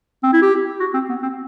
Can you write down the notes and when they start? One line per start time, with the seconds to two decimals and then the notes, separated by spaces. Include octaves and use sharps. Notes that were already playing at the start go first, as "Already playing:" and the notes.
0.23 C4
0.33 E4
0.42 G4
0.80 F#4
0.94 C4
1.09 B3
1.23 C4